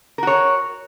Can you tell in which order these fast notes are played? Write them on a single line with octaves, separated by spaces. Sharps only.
A#4 F#4 C#5